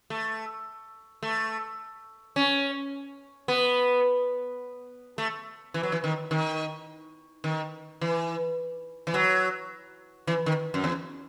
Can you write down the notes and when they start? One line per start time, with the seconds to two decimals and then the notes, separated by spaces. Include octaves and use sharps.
0.10 A3
1.23 A3
2.36 C#4
3.48 B3
5.18 A3
5.74 E3
5.83 F#3
5.92 E3
6.04 D#3
6.31 D#3
7.44 D#3
8.01 E3
9.07 E3
9.14 F#3
10.27 E3
10.46 D#3
10.74 F#2
10.84 E2